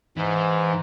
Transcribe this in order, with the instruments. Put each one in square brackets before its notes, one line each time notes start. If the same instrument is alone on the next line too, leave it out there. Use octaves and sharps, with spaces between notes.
[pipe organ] G#2 [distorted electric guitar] E3